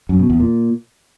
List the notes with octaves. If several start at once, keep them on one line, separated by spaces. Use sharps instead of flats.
F#2
B2
E2
A#2